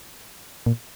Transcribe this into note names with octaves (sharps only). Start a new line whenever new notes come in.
A#2